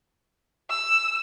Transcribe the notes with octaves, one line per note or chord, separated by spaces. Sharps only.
E6